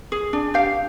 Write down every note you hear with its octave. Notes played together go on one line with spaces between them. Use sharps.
G#4
D4
G4 F5